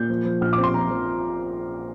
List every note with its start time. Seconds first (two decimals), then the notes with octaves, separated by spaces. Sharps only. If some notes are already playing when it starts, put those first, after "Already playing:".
Already playing: A#2 G6
0.10 F3
0.25 F3
0.41 A#1 F6
0.53 D6
0.58 C4
0.64 C6
0.74 F3 A#5
0.90 F3